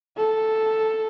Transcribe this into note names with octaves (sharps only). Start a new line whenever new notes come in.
A4